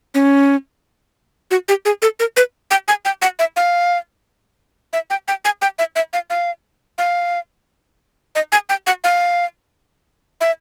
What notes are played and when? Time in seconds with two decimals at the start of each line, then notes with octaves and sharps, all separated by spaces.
0.14 C#4
1.51 F#4
1.68 G4
1.85 G#4
2.02 A4
2.19 A#4
2.37 B4
2.71 G5
2.88 G#5
3.05 G5
3.22 F#5
3.39 E5
3.56 F5
4.93 E5
5.10 G5
5.28 G5
5.45 G#5
5.62 G5
5.79 E5
5.96 E5
6.13 F5
6.30 F5
6.98 F5
8.35 D#5
8.52 G#5
8.69 G5
8.87 F#5
9.04 F5
10.41 E5